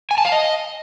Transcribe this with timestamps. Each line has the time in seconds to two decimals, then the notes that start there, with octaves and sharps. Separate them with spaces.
0.11 G#5
0.18 A5
0.25 F5
0.32 D#5